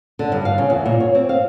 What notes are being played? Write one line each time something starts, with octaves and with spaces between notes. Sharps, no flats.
D3
G2
F5
C#3
E2
A#2
C#5
C4
F5